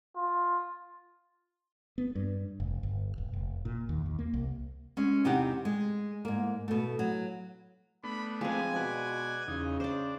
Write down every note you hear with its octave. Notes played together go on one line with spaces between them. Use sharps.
F4
B3
G2
F1
G1
D#1
F1
A#2
D#2
D#2
A#3
C2
G#3 C#4
E2 C3 D#4 G4 F#5
G#3
G#2 A#3
B2 A3
F#3
A3 B3 D4 B5
F3 G#3 C4 G#5
B2 F#4 B4 D5
E2 C#3 D#4
D4 C5 D5